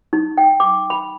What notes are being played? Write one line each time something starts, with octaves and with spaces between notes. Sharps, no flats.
D#4
G5
D6
B5